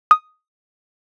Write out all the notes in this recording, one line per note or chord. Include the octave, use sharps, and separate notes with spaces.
D#6